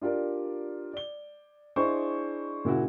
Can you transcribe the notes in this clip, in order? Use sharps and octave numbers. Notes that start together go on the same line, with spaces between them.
D4 F4 G4 A#4 D5
D5 G7
D4 E4 G#4 C5 D#5 C#6
A#2 C#3 E4 F#4